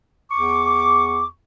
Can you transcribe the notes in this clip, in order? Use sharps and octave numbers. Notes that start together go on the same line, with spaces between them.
E2 C#6 D6